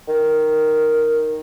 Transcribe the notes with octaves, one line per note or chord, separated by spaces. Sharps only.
D#3